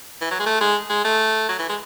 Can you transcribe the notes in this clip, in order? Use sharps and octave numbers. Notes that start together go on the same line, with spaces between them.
E3
F#3
G#3
A3
G#3
G#3
A3
F#3
E3
G#3